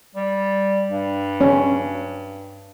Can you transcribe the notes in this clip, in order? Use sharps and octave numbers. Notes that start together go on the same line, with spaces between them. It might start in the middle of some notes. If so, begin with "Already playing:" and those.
G3
G2
C#4